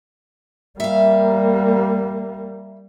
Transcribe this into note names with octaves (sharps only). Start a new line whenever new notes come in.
G3 A#3 E5 F5